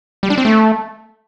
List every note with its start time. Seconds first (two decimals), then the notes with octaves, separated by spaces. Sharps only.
0.23 G3
0.30 D4
0.38 C4
0.45 A3